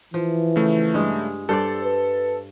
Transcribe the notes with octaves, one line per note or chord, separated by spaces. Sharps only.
E3 F3
C#3 A3
G2 G#3
G2 A4 C5 D5
B4